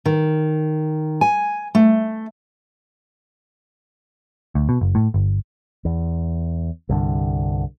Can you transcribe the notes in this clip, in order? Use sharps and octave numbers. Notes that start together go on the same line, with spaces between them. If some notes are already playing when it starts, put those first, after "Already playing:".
D#3
G#5
A3
D2
B2
F#1
A2
G1
E2
C2 G2 D3